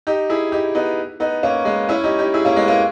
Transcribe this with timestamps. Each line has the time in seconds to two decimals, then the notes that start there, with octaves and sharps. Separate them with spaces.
0.07 D#4 G4
0.30 E4 G#4
0.52 D#4 G4
0.75 B3 D#4
1.20 B3 D#4
1.43 A#3 C#4
1.65 G#3 B3
1.89 C#4 E4
2.04 D#4 G4
2.19 D#4 G4
2.34 E4 G#4
2.45 A#3 C#4
2.56 G#3 B3
2.68 A#3 C#4